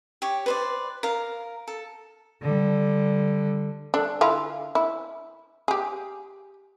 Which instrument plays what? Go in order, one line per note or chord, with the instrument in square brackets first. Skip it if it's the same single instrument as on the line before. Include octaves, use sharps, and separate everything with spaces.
[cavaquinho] G4 C#5
B4 C5 D5
A#4 F5
A4
[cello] D3 G3
[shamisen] D4 A4
D3 E4 F4
E4
G4 G#4